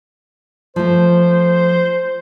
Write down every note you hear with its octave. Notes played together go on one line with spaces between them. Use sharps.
F3 A3 C5